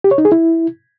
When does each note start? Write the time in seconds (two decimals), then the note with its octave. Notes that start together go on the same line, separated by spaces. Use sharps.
0.04 G4
0.11 C#5
0.18 D#4
0.25 G#4
0.32 E4